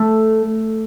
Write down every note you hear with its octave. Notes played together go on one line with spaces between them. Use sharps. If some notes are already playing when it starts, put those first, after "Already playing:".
Already playing: A3